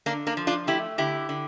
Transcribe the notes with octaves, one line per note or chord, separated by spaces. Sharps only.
D3 A#3 D4
A#3 D4
F3
D4 F4
A3 E4 G4
D3 E4 G4
D3